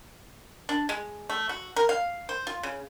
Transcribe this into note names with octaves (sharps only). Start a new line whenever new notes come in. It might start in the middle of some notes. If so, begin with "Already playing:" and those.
D4
G#3
A3
F#4
A#4
F5
C5
F4
C#3